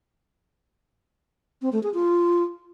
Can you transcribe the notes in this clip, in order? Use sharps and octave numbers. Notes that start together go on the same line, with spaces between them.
C4
A3
G#4
F4